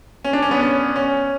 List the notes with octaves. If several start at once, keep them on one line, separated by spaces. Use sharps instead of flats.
C#4
D4
C#4
B3
C#4
C#4